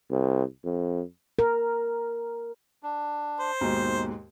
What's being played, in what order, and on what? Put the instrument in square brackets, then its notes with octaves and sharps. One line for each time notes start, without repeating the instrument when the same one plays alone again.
[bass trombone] C2
F2
[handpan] A#4
[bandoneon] D4
[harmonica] C5
[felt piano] D#2 G#2 B2 [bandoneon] D#4